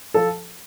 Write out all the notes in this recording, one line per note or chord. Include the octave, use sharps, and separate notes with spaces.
F3 A4 A5